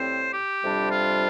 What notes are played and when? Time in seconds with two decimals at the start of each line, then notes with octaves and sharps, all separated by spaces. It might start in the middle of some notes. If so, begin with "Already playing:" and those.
Already playing: A2 G3 C4 C5
0.31 G4
0.62 F2 C3 G3 D4
0.91 F4